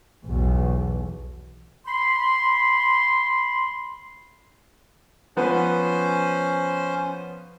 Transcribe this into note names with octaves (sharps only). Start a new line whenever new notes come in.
B1 E2
B5 C6
F3 B3 C#4 B4 C5